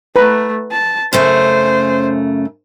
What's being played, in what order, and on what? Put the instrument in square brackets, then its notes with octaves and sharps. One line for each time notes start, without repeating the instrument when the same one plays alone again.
[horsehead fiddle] A3 [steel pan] B4 A#5
[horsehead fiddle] A5
[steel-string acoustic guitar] F#2 C#3 A3 [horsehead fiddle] C5